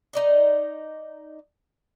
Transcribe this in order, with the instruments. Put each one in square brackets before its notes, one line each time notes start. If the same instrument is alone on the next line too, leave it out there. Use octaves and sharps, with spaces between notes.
[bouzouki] D#4 D5 D#5